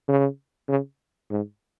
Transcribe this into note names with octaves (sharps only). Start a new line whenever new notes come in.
C#3
C#3
G#2